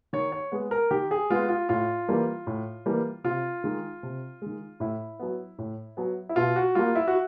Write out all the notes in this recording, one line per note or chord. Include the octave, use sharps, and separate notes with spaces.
D#3 C#5
C#5
G#3 B3
A#4
D#3 G4
G#4
G#3 B3 F4
F4
A2 F4
E3 G3 A#3
A2
E3 G3 A#3
C3 F4
D#3 G#3
C3
D#3 G#3
A2 E4
F#3 B3
A2
F#3 B3
E4
B2 F4
F#4
G3 A#3 F4
E4
F#4